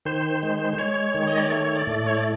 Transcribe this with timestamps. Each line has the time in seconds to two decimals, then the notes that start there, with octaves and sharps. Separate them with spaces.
0.06 D#3 C5
0.43 G#3
0.73 C5
0.78 G#3 C#5
1.14 D#3
1.27 D#5
1.40 D5
1.51 A3 C#5
1.75 D5
1.87 A2
1.99 D5
2.07 C#5
2.15 D5